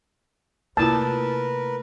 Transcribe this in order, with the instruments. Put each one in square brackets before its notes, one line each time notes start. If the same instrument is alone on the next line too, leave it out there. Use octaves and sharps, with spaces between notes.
[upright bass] C3 A3 [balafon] A#3 E4 F4 [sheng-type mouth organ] A#4 B4 [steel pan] A5